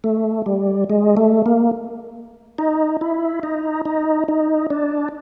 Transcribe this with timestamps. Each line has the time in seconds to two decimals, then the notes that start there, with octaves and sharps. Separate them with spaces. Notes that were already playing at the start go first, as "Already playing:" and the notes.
0.04 A3
0.46 G3
0.90 G#3
1.17 A3
1.46 A#3
2.58 D#4
3.01 E4
3.43 D#4
3.85 D#4
4.28 D#4
4.70 D4